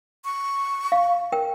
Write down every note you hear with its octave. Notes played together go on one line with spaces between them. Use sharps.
C#6
F5
A#4 G5